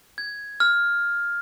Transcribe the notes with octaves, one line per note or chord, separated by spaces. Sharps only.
G#6
F6